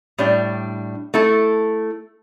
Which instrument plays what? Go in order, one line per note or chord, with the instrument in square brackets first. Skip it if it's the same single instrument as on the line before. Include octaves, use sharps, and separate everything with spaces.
[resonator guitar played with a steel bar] A2 G3 D4
A3 E4 A4